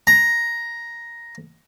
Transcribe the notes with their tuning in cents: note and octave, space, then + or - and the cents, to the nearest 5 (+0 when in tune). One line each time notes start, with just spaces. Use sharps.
A#5 +5